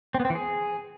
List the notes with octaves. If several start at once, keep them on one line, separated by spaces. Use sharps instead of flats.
C4
B3
C4
E3
G#4